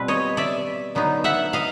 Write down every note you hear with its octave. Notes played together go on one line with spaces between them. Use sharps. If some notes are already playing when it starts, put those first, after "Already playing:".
Already playing: B2 G3 C4 F4 B4
C#5 D#5
D5 E5
D3 F#3 B3 D#4
E5 F#5
D#5 F5